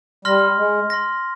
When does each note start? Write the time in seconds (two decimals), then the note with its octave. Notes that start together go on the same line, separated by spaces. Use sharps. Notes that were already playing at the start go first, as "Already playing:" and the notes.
0.25 G3 C6 F6 A#6
0.57 G#3
0.90 C6 F6 A#6